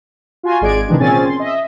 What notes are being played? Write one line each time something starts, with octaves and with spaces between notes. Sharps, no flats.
F4 F#4 G#5 C6
G#1 G#3 D5 G#6 D7
C3 D#3 E3 G#3 D4 G4
A#2 C4 C#4 G#4 G#5 A6
C6
D#5 E5